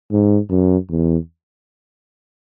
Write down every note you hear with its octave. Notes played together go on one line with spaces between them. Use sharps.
G#2
F#2
E2